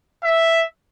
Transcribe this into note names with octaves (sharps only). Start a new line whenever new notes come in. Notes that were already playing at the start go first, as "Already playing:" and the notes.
E5